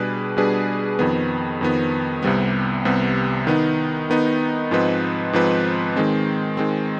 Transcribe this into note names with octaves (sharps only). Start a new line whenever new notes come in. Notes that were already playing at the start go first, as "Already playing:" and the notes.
Already playing: B2 G3 D4 G#4 B4
B2 G3 D4 G#4 B4
F2 D#3 B3
F2 D#3 B3
C2 C3 G3 B3
C2 C3 G3 B3
D#3 B3 D#4
D#3 B3 D#4
G#2 F3 C4 D#4 B4
G#2 F3 C4 D#4 B4
D#3 G#3 C4
D#3 G#3 C4